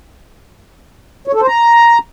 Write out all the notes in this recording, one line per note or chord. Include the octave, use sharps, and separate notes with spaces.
C#5
A4
C5
A#5